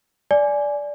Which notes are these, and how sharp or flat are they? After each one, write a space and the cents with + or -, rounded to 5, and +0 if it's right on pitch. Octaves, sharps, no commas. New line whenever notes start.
D5 -10 G#5 +10